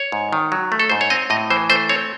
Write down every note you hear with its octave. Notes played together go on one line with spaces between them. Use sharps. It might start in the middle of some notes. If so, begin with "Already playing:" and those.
Already playing: C#5
G#2
D#3
F#3
A3
A4
G#2 C5
C#5
C4 D#5
A2 D#5
E3 C5
A3 C5
C4 C#5